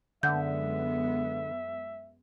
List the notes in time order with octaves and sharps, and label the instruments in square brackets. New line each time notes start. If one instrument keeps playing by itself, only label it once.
[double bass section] F#2 G#3 B3 [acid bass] D3 [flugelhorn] E5 [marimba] F#5 G6